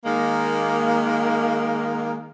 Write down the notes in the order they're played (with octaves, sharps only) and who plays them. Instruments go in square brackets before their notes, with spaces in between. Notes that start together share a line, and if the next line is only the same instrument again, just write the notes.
[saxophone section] D#3 G#3 A#3